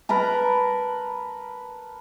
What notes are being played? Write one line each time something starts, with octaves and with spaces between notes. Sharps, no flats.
A#4 B4 A5 A#5